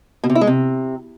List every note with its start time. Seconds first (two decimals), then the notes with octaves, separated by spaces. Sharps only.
0.24 B2
0.29 C3
0.35 E4
0.41 G#3
0.47 C3